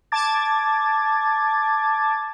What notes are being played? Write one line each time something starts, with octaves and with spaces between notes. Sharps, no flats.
A5 D6 G#6 A6